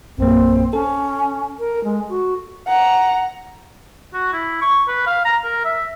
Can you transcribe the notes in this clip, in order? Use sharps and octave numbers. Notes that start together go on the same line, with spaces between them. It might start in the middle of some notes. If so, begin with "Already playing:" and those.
A#1 F#2 A#3 C4
C#4 A4
A#4
G#3
F#4
F#5 A#5
F#4
E4
C#6
B4
F5
A#5
A#4
E5